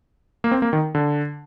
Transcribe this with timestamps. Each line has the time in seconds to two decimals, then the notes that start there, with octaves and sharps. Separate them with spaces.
0.44 A#3
0.52 C4
0.62 A#3
0.73 D#3
0.95 D3